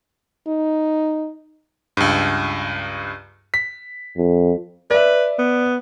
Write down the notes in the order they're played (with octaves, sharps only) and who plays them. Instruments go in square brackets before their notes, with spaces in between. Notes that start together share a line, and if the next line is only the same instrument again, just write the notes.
[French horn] D#4
[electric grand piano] C#2 G2
B6
[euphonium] F2
[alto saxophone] B4 [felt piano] D5 E5
[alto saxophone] B3